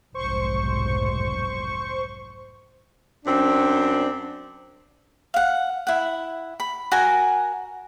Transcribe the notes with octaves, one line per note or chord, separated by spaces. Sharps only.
F1 B1 G#2 C5 C#6
F#2 C4 D4
F5 F#5
E4 F#5
B5
F#4 A#4 G#5 A#5